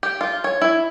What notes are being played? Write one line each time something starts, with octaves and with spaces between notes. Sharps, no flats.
G4
F4
C#5
E4